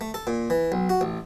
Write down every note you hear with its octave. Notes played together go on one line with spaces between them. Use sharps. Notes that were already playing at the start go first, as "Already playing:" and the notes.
A3
A4
A#2
E3
B1
F#4
A1